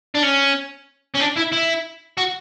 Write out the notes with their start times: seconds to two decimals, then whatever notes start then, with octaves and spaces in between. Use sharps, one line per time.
0.15 D4
0.23 C#4
1.14 C#4
1.20 D4
1.36 E4
1.52 E4
2.18 F#4